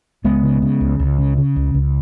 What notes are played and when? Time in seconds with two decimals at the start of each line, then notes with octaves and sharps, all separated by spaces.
0.24 C#2 G#3 B3
0.43 C#3
0.62 C#3
0.81 C#2
0.99 C#2
1.19 C#3
1.38 C#3
1.56 C#2
1.74 C#2